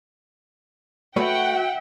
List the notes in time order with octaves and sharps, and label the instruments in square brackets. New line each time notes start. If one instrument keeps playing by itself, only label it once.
[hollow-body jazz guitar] A3 B4 C#5 [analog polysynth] F#4 [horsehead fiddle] E5 [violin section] F#5 G5